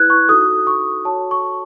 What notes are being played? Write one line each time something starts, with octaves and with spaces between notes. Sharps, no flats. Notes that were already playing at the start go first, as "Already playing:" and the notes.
Already playing: E4 B4 F#6 G#6
C#6
D#4 F#4 A4 D#6
C#6
F#4 A4 C#5 A5
C#6